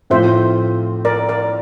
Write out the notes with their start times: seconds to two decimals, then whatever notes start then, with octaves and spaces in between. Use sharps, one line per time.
0.10 A2 F3 C4 F4 C5 E5
1.05 A#4 D5
1.29 A#4 D5